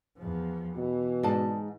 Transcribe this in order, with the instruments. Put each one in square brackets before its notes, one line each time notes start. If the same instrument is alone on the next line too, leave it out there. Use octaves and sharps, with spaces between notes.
[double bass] E2 F3
[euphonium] B2 [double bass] E3
[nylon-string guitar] G#2 [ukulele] G#4 D5 A5